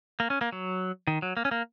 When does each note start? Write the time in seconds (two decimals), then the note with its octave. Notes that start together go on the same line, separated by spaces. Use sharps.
0.20 A#3
0.30 C#4
0.41 A#3
0.52 F#3
1.07 D#3
1.22 F#3
1.37 A#3
1.45 C#4
1.51 A#3